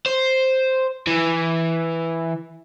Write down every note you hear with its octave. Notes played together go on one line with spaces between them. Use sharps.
C5
E3